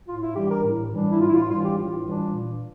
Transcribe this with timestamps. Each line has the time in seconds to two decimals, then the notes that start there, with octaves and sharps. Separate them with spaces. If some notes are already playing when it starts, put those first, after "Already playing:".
0.07 A2 F4
0.21 E4
0.35 E3 G3 D4 G4
0.49 A#4
0.63 A2
0.91 E3 G3 D4
1.09 E4
1.20 A2 F4
1.29 E4
1.34 F4
1.49 E3 G3 D4 F4
1.63 G4
1.77 A2 F4
2.06 E3 G3 D4
2.33 A#2